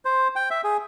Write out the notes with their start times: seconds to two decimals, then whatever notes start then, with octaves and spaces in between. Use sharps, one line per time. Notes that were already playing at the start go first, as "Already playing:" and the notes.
0.05 C5
0.36 G5
0.50 E5
0.64 G#4